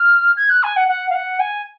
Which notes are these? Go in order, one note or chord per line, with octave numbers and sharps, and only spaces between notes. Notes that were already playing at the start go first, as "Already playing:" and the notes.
Already playing: F6
G#6
F#6
G#5
F#5
F#5
F5
F#5
G#5